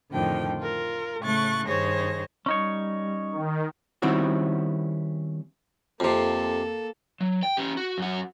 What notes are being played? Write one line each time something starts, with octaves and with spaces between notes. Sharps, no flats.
F2 A2 D3 D#3 F3 G5
F4 A#4
A2 C#3 A3 C#6 F#6 A6
G2 D#3 G#4 C5 C#5 A#6
G3 C#4 D#4 C#5
D#3
D#3 G3 C4 C#4 E4 F#4
F2 C3 A#3 A4
F#3
G5
C#4 G4
F#4
F#2 F#4